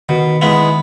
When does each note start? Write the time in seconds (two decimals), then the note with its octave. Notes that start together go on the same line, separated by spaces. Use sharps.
0.09 B2 D#3
0.41 G#3 B3 E4